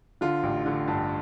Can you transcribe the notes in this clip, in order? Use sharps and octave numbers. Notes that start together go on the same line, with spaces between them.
D3 F4
A1
D3
G2